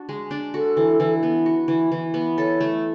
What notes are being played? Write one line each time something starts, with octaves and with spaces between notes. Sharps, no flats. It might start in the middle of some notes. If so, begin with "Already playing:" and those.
Already playing: D4 F#4
G#3
D4
F#4 A4
E3
E3
B3
F#4
E3
E3
B3
A4 C#5
A3